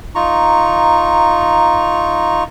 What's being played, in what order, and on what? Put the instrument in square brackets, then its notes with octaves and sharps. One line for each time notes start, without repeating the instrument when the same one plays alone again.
[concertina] D#4 F4 A#5 C#6